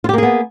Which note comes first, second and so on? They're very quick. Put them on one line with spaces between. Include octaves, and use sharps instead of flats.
F4 G4 A#3 G#4 B3